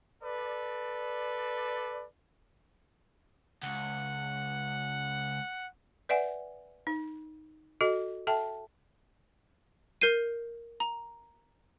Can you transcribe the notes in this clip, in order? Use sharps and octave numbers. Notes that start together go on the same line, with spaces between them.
A4 B4 D5
C#2 F#5
B4 D5 E5 F#5 G#5
D#4
F#4 A4 D#5
A4 E5 G5 A5
A#4 G6 C7 D#7
A#5